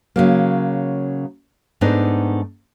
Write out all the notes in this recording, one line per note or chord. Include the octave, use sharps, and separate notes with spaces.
C#3 F#3 A#3
G#2 A3 B3 D4 D#4